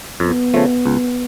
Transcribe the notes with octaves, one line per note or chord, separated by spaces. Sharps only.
F2 B3
C#3 F3 A3
C#2